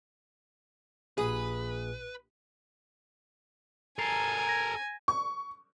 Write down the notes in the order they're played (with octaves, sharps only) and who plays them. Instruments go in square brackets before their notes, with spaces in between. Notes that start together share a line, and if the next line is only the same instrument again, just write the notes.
[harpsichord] A#1 D#6 [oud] G#4 [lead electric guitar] B4
[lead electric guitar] A4 A#4 [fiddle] G#5 [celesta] A#5 C7 F7
[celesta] G#6 A#6
[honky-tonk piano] C#6